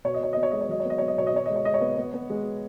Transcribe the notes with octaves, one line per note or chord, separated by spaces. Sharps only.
B2 C#5
D#5
B2 C#5
B3 D#5
C#5
G#3 D#5
C#5
F#3 D#5
C#5
B3
D#5
B3 C#5
D#5
B2 C#5
D#5
B2 C#5
G#3 D#5
C#5
G#3 D#5
C#5
B3
B3
B3
G#3